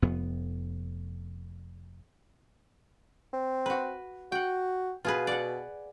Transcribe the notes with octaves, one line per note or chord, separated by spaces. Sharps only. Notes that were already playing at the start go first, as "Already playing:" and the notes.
F1 F2 B3
C4
F#4 B4
F#4 F#5 G5
B2 F4 G#4 B4
D5 F#5